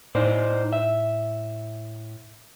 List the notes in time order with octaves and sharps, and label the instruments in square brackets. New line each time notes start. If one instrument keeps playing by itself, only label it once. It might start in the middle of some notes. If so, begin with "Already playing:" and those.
[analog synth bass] A2 [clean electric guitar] D#4 C5 D5
[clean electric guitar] E5